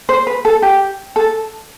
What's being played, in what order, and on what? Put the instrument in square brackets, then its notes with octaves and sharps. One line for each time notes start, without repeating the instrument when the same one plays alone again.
[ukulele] C5
B4
A4
G4
A4